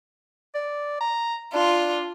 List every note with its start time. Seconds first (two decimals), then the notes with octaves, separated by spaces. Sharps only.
0.55 D5
1.01 A#5
1.54 D4 F4